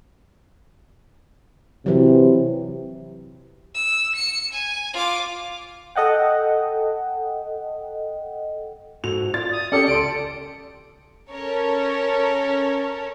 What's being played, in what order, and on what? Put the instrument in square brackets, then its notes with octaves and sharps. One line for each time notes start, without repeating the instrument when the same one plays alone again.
[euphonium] C3 [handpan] E3 F#3
[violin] E6
C#7
G#5
F4 D6
[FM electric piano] A4 D#5 F#5 G5
[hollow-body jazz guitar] G#2 F#4 A4 [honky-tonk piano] F7
[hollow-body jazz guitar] F4 D5 [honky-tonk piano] A6
[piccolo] D#6
[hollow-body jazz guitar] C#4 [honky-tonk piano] G4 A4 D5 [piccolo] C#7
[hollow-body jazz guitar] C#2 C6 [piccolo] D7
[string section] C#4 A4 A#4 C#5